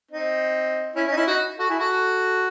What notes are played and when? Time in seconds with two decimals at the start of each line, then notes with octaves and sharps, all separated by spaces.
0.11 C4 D#4
0.96 C#4 E4
1.06 C#4
1.12 D#4
1.17 C#4 E4
1.27 D#4 F#4
1.59 F#4 A4
1.69 E4 G#4
1.79 F#4 A4